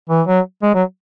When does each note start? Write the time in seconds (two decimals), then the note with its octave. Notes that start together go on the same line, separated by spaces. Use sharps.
0.10 E3
0.27 F#3
0.63 G#3
0.74 F#3